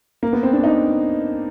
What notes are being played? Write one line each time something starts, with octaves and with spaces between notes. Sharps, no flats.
A#3
B3
C4
D4
D#4